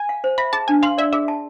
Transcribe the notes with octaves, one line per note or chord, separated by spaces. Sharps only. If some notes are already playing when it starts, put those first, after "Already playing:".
Already playing: G#5
F5
C5
E5 B5
G#4 A5
D4 G#5
F5 C6
D5 E5
G#4 E5
A5